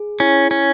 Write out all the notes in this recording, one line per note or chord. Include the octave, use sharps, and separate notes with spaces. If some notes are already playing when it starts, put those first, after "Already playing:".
Already playing: G#4
C#4 E4
C#4